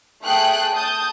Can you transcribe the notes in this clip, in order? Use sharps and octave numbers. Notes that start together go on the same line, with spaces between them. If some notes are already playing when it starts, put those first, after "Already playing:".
A3 G#4 G5 F#6
A5 D#6 G6